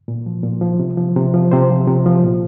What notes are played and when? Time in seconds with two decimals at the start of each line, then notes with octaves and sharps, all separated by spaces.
0.08 A#2
0.26 F3
0.43 A#2
0.61 F3
0.80 C3
0.97 F3
1.17 C3
1.34 F3
1.52 C3 C5
1.70 F3
1.88 C3
2.06 F3
2.24 A#2